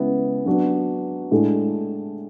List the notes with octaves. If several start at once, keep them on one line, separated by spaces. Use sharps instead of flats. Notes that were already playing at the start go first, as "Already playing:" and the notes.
Already playing: C#3 G#3 B3 E4
F#3 B3 D4 F#4
A2 G#3 D4